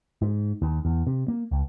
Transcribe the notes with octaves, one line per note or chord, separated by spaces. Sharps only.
G#2
D#2
E2
C3
A#3
C#2